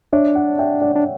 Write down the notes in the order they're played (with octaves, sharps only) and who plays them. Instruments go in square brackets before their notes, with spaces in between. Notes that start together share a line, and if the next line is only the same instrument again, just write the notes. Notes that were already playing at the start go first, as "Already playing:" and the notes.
[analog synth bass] D4 [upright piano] C#5 E5
[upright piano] D5 F#5
E5 G5
D5 F#5
[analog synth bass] D4